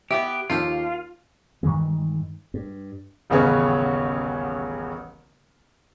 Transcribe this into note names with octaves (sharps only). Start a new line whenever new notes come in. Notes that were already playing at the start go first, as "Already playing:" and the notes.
B3 E4 G4 E5
D#2 F4 G4 A4 F5
G2 D#3 E3 G#3
G2
D#1 A1 C#3 B3 C#4 C#5